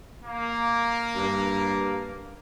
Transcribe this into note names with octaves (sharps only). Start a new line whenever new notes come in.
A#3
G2